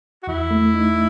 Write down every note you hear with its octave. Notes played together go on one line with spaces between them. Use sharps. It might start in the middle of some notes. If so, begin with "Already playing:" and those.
F#4
E2 E4
A3
D#4